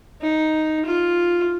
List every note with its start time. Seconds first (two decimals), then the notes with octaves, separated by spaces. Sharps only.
0.21 D#4
0.85 F4